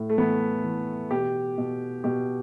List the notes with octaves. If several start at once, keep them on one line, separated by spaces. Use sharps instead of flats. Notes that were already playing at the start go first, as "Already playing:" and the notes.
Already playing: A2
A3
E3 B3
E3
B2 G4
B2
B2 G4